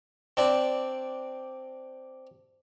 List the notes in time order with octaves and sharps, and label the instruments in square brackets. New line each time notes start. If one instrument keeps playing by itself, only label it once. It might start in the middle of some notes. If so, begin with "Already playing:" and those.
[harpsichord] C4 D4 D5